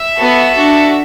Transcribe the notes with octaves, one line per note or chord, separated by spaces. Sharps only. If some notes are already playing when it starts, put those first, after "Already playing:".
Already playing: E5
B3 F#4 A4
D4 F#4 A4